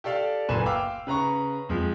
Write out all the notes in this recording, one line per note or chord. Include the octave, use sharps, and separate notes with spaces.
G4 A4 D5 F5
F#1 A#2 B4 G#5 E7
F5 G5 D6 E6
C#3 B4 A#5 C#6
F2 F3 G#3